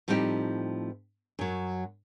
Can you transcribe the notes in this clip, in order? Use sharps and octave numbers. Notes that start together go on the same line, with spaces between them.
A2 F3 G3 C4 D#4 G4
F#2 F#3